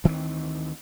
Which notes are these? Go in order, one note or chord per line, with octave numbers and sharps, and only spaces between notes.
D2 D#3 E3 C4